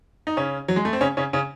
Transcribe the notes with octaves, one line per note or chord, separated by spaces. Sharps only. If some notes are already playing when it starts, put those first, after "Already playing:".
D#4
C#3 C#4
F#3
G#3
A3
C4
C#3 C#4
C#3 C#4
C#3 C#4